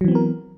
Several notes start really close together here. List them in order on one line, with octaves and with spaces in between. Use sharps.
F#3 E3 C4 B3 A#4